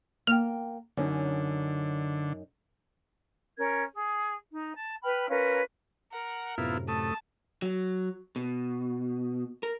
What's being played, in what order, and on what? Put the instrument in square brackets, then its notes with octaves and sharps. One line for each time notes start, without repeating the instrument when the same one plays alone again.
[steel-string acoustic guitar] A#3 G5 [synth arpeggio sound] F6
[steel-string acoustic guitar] F#2 C#4 D#4 [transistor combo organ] D3
[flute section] C#4 A#4 G#6
G#4
D#4
A5
B4 G5 B5 F6
C#4 F4 A#4 B4
[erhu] A#4 [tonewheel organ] F#5
[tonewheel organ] F#2 A2 C3 [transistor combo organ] B3 E4 F4
[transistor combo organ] A3 D#6 [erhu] A5
[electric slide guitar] F#3
B2
A#4